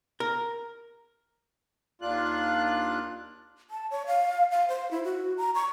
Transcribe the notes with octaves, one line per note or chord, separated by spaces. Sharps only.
A#4
D#2 D4 F4 F#6
A5
C#5
F5
F5
C5
E4
F#4
A#5
C#6